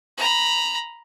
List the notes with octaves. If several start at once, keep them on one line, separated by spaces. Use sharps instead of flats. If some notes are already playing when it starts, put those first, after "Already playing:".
A#5 B5